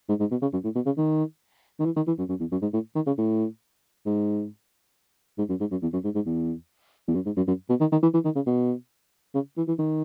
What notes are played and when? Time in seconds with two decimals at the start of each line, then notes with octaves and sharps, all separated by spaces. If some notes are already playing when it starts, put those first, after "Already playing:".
0.09 G#2
0.20 G#2
0.31 B2
0.42 C#3
0.53 F#2
0.64 A2
0.76 B2
0.86 C#3
0.97 D#3
1.80 D#3
1.85 E3
1.96 D#3
2.07 E3
2.18 F#2
2.29 F#2
2.40 E2
2.52 F#2
2.62 G#2
2.74 A2
2.95 D#3
3.07 C#3
3.18 A2
4.06 G#2
5.38 G#2
5.49 F#2
5.60 G#2
5.71 F#2
5.82 E2
5.93 F#2
6.04 G#2
6.15 G#2
6.26 E2
7.08 E2
7.15 F#2
7.26 G#2
7.37 F#2
7.48 F#2
7.70 B2
7.81 D#3
7.92 D#3
8.03 E3
8.14 E3
8.25 D#3
8.36 C#3
8.46 B2
9.35 C#3
9.57 E3
9.68 E3
9.79 D#3